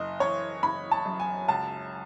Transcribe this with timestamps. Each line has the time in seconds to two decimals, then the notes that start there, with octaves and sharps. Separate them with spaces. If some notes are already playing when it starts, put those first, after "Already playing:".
Already playing: F#1 D#5
0.20 E3 C#5
0.63 F#1 B5
0.91 A5
1.06 F#2
1.20 G#5
1.48 C#2 A5